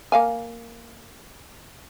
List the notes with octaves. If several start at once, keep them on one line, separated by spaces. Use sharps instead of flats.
A#3 F5 G#5